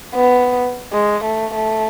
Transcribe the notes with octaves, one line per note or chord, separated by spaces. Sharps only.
B3
G#3
A3
A3